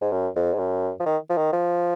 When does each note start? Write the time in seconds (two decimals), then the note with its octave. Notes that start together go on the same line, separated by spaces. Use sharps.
0.01 G#2
0.12 F#2
0.36 F2
0.54 G#2
0.59 F#2
1.00 F3
1.06 D#3
1.30 F3
1.37 D#3
1.53 F3